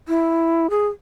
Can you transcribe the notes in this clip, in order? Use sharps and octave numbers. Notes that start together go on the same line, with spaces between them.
E4
G#4